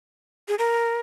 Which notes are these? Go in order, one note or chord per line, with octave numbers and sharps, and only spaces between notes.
G#4
A#4